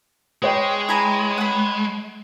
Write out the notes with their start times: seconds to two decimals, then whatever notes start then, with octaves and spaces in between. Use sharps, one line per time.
0.42 G#3 B4 C#5 G5
0.89 E4 G#5 A#5
1.38 F#5 B5